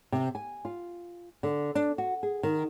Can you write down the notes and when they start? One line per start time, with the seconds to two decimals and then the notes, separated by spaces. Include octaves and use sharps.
0.12 C3
0.35 G#5
0.65 F4
1.43 D3
1.75 D4
1.98 F#4
2.23 G#4
2.43 D#3